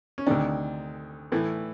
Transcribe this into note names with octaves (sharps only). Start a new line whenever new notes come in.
C#4
D2 C3 D#3 D4
A2 E3 A3